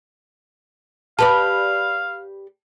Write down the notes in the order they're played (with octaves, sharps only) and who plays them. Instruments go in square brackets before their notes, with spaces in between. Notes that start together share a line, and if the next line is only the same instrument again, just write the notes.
[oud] G4 B4 D5 [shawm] F5 [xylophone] A5